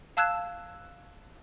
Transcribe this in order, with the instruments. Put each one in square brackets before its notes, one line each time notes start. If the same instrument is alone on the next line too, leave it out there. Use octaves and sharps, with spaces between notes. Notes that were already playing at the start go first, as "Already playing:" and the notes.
[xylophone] F5 A5 E6 F#6 G#6 E7